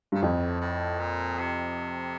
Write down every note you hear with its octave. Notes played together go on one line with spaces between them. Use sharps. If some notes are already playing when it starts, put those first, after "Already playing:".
G2 A#2
F2 A2
A2
A#2
C3